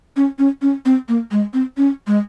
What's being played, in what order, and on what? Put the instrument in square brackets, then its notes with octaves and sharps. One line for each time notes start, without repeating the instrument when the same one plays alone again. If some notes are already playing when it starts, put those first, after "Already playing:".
[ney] C#4
C#4
C#4
C4
A#3
G#3
C4
C#4
G#3